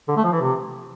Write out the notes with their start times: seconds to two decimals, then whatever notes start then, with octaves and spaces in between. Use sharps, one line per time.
0.08 D3
0.16 A3
0.24 F3
0.32 E3
0.41 C3